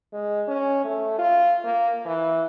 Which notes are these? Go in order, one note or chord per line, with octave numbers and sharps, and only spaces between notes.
G#3
C#4
A3
F4
A#3
E3